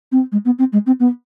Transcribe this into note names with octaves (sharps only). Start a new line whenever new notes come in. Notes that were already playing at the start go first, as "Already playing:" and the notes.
C4
G#3
B3
C4
G#3
C4
B3